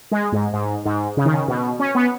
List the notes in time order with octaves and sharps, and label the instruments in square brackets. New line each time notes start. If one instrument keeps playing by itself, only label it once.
[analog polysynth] G#3
G#2
G#2
G#2
C#3
D#3
C#3
B2
C#4
B3